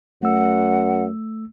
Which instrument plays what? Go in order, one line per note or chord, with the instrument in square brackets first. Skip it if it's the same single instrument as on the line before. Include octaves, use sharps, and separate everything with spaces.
[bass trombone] F#2 [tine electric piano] A3 E6 [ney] F#5